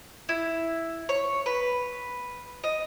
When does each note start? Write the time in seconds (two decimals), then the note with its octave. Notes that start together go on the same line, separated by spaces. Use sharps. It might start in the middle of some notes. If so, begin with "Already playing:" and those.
0.29 E4
1.09 C#5
1.46 B4
2.64 D#5